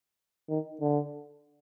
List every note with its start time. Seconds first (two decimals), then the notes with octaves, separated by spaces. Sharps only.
0.49 D#3
0.81 D3